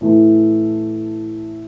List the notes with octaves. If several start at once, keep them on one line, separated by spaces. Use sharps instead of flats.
A2 E3 A3